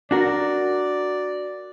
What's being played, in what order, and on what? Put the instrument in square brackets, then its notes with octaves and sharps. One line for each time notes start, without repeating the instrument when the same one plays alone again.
[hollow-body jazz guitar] D4 F#4 A#4 [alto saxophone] D5